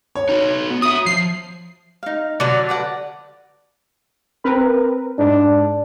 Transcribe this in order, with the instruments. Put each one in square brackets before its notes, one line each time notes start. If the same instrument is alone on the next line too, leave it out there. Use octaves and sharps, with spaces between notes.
[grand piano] C#5
[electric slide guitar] D#4 F#4
B3
[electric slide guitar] F#4 E5 [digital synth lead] D#6
[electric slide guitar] F3 [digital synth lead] C7
[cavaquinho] D#4 F5
[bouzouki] D3 F#3 [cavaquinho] D5
[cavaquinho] B4 D5 F#5
[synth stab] C4 A#4 B4
[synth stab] G#2 [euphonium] D4